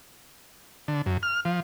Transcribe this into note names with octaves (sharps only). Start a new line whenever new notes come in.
D3
F#2
F6
F3